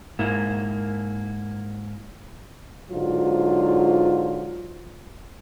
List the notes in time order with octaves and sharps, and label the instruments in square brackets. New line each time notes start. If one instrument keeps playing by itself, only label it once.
[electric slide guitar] G#2 A#3 E4
[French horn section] G#2 D3 F#3 F4